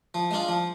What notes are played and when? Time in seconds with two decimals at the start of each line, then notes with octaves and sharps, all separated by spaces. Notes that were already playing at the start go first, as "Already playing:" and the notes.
0.14 F3
0.31 G#3 D4 F4
0.48 F3